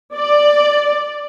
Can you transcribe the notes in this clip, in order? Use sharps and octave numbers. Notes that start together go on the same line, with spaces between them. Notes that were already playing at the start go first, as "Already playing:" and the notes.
D5